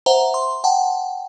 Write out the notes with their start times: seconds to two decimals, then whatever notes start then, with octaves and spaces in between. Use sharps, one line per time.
0.06 C5 E5 F#5 A#5
0.34 C6
0.64 F#5 G5 A5